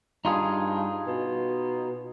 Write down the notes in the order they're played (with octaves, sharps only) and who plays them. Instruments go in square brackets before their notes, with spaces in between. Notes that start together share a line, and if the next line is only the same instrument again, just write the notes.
[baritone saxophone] G2 [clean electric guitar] D#4 F4 G#4
[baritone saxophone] B2